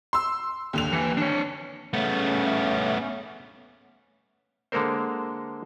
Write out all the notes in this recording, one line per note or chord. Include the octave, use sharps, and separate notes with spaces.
C6 E6
D#2 D3 F7
E3
D4 C#5
C#3 A3 B3 C#4
D3 G#3 A#3 A4 A#4 C5